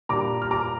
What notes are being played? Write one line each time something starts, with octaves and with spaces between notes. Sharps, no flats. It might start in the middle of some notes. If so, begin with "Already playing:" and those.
A#2 G3 D4 F4 A#5 D6
F6
A#5 D6